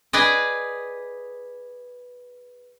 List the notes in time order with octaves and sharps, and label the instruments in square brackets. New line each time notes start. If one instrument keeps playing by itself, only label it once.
[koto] G#4 B4 D5 D#5